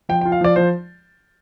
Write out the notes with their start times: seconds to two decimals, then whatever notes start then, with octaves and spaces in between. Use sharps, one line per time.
0.09 F3 G5
0.21 G5
0.25 F4
0.32 F5
0.41 F3 D5
0.56 F3 C5